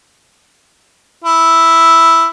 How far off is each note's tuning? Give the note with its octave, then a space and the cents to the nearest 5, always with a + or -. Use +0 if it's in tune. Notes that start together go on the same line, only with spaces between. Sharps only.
E4 +0